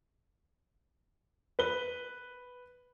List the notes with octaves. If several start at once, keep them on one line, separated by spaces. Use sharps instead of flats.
B4 G7